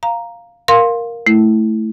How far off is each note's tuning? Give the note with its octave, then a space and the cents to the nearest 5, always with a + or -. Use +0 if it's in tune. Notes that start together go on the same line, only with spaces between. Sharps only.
F5 +0 A#5 +0
A#4 +0 F5 +10 C6 +15
A3 +0 E4 +0